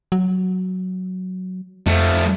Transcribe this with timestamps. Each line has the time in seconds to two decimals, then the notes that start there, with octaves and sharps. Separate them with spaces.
0.12 F#3
1.86 F2 F3 A3